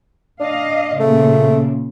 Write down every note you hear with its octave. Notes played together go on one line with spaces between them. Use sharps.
D4 D#5 F5
A#2 C#3 A3